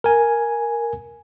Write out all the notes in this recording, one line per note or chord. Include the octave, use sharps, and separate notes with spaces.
A#4 G#5